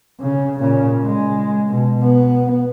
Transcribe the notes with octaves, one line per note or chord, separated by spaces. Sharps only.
C#3
A#2 C#3
G#3
B2
B3